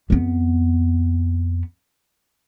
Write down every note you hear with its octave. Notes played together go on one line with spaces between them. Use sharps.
F2 B3